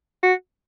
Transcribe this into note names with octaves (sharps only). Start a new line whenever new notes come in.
F#4